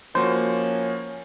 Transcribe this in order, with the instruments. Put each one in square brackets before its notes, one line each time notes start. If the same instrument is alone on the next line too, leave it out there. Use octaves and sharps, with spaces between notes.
[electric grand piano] F3 A#3 F#4 [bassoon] C#4 [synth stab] C5